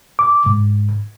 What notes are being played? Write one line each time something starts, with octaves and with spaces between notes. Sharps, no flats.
D6
G#2